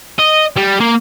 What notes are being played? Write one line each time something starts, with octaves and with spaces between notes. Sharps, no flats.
D#5
G3
A#3